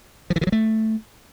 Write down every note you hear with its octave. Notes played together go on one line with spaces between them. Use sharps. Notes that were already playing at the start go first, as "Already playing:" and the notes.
F3
E3
D#3
F#3
A3